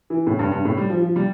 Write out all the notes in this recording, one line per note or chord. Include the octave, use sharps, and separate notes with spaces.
E3
A2
G2
G2
A2
G3
F3
F3
G3